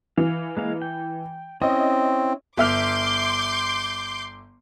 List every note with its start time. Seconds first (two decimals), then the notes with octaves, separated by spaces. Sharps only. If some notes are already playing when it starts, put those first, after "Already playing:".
0.18 E3 F5
0.57 G#3 A#3 F5
0.82 G5
1.62 C4 C#4 E4 D#5
2.57 G1 E5 C6 D6 F6 G6